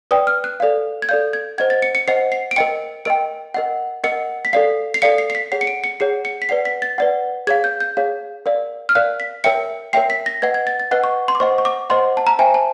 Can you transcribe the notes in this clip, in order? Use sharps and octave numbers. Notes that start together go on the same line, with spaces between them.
B4 D5 G5 D#6
F6
F#6
A4 D5 F5
G#6
A4 D5 F5 G6
G#6
C5 D#5 F#5 G#6
A6
C#7
C#7
C5 D#5 F#5 C7
C7
D7
A#4 D#5 G5 C#7
A#4 D#5 G5 D7
A#4 D#5 F#5
A#4 D#5 F#5 C#7
B6
A4 D5 F5 C7
C7
A4 D5 F5 C#7
C7
C7
B6
G#4 C#5 F#5 C7
C#7
D7
C#7
G#4 C#5 F#5 C7
C#7
B6
B4 D5 F#5 C7
B6
A6
B4 D5 F#5
G#4 C#5 F5 G#6
G6
G6
G#4 C#5 F5
A#4 D5 F5
F6
A#4 D5 F5 F#6
B6
A#4 C#5 E5 G5 C#7
A#4 C#5 E5 G5 C7
B6
A#6
B4 D#5 F#5 G#6
G#6
A6
A6
B4 D#5 F#5 F#6
C#6
C6
D6
C5 D#5 F#5 C#6
C#6
D6
C5 D#5 F#5 C6
A5
A#5
C5 E5 G5 G#5
A5